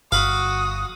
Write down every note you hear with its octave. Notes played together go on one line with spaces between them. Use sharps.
G1 F#4 F5 B5 D#6